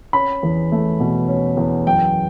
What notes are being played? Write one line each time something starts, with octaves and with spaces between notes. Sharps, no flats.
C#4 B5
E2
A3
B2
C#4
E2
F#2 G5